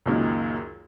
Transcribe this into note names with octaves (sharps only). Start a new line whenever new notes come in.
C#2 F#2 A#2 D#3